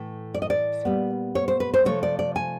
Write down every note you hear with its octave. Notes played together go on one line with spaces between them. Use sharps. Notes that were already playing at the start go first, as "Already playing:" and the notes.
Already playing: A2 E3 A3
D5
D#5
D5
A#2 G3 B3
C#5
C5
B4
C5
C3 F3 A3 C#5
D5
D5
G#5